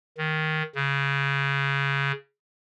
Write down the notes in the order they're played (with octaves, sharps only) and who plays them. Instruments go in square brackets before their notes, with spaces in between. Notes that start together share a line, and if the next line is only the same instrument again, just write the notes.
[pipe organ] D#3
C#3